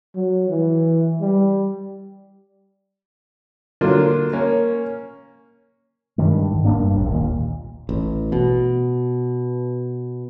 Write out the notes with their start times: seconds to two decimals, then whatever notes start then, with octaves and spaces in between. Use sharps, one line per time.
0.15 F#3
0.49 E3
1.21 G3
3.81 D3 F#3 A#3 D4 F4
4.33 A#3 C#4
6.18 G2 D#3 G#3
6.51 G#2
6.65 F1 F#2 A#3 D4
6.79 G2
6.96 D#1 A#1
7.11 D#2 A#2
7.89 A1
8.32 B2